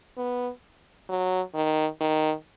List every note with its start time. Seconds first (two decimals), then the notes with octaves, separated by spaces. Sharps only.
0.17 B3
1.09 F#3
1.55 D#3
2.01 D#3